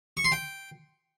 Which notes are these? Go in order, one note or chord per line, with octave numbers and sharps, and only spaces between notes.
C#6
C6
G5